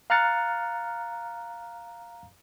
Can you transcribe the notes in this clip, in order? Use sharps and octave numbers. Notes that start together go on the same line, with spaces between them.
F5 A#5 F6 F#6 A6 C#7